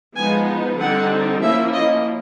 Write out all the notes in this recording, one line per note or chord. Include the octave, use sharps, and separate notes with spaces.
F3 G#3 B3 D#4 G#5
D3 G3 C4 D#4 F#5
F3 A#3 C#4 E4 E5
D#5